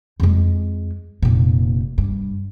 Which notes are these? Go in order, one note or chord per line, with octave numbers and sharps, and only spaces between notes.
F2 G#3
F1 A#2
G2